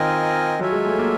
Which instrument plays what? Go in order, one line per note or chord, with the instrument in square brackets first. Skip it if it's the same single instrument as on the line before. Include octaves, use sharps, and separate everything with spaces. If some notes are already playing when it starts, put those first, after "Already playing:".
Already playing: [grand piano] D#3 [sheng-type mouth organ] C4 F4 A#4 D#5 G#5
[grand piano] F#3 [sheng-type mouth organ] F4 A4 C#5 E5 G#5
[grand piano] G#3
A3
A#3